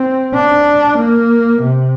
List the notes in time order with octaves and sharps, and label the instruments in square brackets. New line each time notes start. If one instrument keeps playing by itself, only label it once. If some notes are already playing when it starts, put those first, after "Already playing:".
Already playing: [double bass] C4
D4
A#3
C3